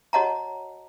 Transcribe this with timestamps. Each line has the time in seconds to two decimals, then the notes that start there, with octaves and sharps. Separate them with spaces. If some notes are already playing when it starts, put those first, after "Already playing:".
0.13 F#4 C#5 D#5 F#5 A5 A#5